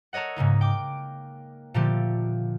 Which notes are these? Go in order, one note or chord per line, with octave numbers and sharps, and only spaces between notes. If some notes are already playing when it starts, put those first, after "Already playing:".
A4 A#4 C#5 D#5 F#5
G#2 C#3 A#3 D#4
G5 D6
A#2 D3 F3 A3 G4